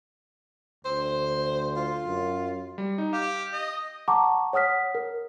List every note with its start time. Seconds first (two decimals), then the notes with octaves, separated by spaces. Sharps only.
0.85 D2 C5
1.76 F4
2.06 F#2
2.78 G3
2.98 D#4
3.13 G4 F5
3.53 D#5
4.08 F#5 A5 A#5 C#6 D6
4.53 C#5 F#5 D#6 F6 B6
4.95 A#4